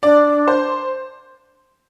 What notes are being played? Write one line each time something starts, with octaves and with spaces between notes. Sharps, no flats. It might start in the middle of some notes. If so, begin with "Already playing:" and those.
D4 D5
C5